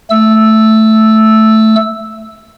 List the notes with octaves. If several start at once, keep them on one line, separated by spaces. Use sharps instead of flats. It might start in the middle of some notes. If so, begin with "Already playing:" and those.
A3 E6